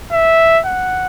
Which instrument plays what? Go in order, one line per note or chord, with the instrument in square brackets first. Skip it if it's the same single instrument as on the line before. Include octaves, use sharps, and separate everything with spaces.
[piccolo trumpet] E5
F#5